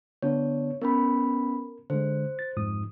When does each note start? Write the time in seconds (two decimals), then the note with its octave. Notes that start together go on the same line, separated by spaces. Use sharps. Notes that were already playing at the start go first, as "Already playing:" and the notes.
0.22 D3 B3 D4 C#5
0.82 B3 C#4 A#4 B5
1.90 D3 G#3 C5
2.39 A6
2.57 F2 G#2 D#6